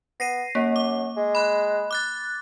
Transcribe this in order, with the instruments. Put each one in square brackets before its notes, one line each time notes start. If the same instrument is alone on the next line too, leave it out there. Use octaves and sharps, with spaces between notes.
[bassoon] B3 [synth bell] A#6 C7 D#7
[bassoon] F#2 [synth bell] A#3
[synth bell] D6
[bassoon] G#3
[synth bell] B5 F#6
D6 F#6 A6